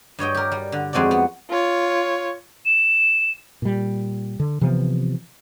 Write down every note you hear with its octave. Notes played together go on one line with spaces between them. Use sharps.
G2 C#5 D#5 G5
G4 A#4
G3
D3
F2 G#3 C4 F#4 D5
B3
F4 C#5
E7
A#2 G3
D3
C3 E3 F3 B3